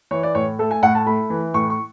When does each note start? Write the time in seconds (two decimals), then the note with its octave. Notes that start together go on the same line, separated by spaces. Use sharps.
0.11 E3 C#5
0.23 D5
0.35 A2 C#5
0.59 A3 A4
0.71 G#5
0.83 A2 F#5
0.95 A5
1.07 A3 B5
1.30 E3
1.54 A2 C#6
1.70 C#6